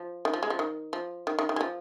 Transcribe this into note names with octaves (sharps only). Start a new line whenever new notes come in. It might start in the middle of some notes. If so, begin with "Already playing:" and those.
Already playing: F3
D#3
F3
G#3
F3
D#3
F3
D#3
D#3
D#3
G#3
F3